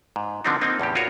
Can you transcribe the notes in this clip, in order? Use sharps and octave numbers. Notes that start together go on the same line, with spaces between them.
G#2
D3 F3 B3 C4 D4 D#4
A#3 C4 D#4
E2 A2 C#4 G4
F4 F#4 G#4 A#4 C#5 D#5